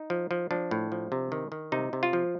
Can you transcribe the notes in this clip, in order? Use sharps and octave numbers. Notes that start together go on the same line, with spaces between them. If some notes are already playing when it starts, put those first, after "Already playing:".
Already playing: D#4
F3
F3
F3 D4
A2
F3
C3
D#3
D#3
C3 D#4
C3
F4
F3